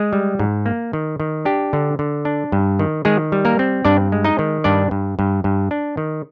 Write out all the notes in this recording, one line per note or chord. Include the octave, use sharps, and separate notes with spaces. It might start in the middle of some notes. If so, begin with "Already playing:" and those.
Already playing: G#3 G#4
G3
G#2
A#3
D#3
D#3
D4 G4
D3
D3
D4
G2
D#3
D#3 G#3 G#4
G3
A#3 A#4
C4
G2 D4 D5
G#3
D#4 D#5
D#3
G2 D4 D5
G2
G2
G2
D4
D#3